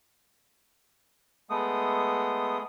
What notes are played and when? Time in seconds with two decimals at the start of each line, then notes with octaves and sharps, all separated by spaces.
1.50 G#3 A3 B3 D#6